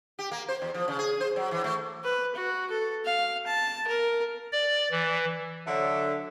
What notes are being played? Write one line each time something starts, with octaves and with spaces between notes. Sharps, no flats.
G4
A#3
C5
E2
F3
C#3
G#4
C5
F#3
E3
A3
B4
F#4
A4
F5
A5
A#4
D5
E3
D3 F#3 E5